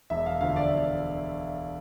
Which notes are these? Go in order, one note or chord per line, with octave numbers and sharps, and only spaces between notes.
E1 E5
F5
D2 D3 F3 A3 F5
D5
E1